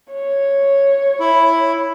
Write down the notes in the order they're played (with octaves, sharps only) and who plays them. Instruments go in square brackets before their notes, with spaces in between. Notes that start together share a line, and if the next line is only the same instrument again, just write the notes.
[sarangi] C#5
[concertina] E4